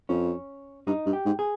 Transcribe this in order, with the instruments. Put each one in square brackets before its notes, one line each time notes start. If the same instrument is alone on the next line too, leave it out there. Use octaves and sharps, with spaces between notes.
[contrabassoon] F2 [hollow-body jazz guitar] C#4
[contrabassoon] G2 [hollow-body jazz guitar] D#4
[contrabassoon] G2
[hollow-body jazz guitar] G4
[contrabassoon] G#2
[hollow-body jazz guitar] G#4